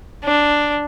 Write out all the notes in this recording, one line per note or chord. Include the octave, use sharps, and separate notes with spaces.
D4